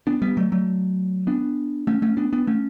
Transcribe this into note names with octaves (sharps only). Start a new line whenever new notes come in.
B3 D4
G3 B3
F#3 A3
F#3 A3
B3 D4
A3 C#4
A3 C#4
B3 D4
B3 D4
A3 C#4